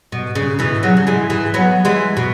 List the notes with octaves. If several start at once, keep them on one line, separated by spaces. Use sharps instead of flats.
B2
C#3
B2 E3
C#3 F#3
F#3
E3 G#3
E3 G#3
F#3 B3
E3 G#3
B2